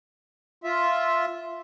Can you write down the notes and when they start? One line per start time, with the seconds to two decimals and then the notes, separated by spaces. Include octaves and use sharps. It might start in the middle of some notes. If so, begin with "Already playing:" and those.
0.64 F4 E5